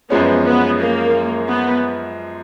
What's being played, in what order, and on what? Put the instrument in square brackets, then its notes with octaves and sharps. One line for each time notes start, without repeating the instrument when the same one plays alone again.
[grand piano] F#2 F3 G#3 C#4 [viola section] B3
[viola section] B3
A#3
B3